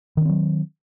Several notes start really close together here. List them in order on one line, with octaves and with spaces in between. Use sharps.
D#3 C#4 C4 F#3